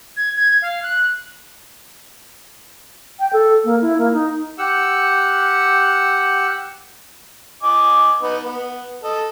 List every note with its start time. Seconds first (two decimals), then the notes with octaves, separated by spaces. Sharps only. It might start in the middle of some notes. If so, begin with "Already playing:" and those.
0.17 G#6
0.37 G#6
0.62 F5
0.83 F#6
3.20 G5
3.33 A4
3.64 A#3
3.81 E4
3.98 A#3
4.13 D#4
4.58 G4 F#5 E6
7.63 D#5 G#5 D6
8.22 B3 D#4 B4
8.44 B3
9.04 A4 D#5